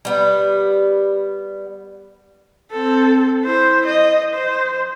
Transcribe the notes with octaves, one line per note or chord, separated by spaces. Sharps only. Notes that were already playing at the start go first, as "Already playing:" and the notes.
G3 B3
C4 A4
E4 C5
D#5
C5